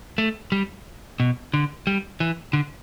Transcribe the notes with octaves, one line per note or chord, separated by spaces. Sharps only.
A3
G3
B2
D3
G3
E3
D3